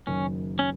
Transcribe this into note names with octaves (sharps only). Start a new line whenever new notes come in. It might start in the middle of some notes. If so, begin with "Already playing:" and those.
F#1 F#2 D#3 F#3 C#4
C#4